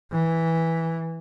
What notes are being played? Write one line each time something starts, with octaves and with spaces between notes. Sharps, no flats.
E3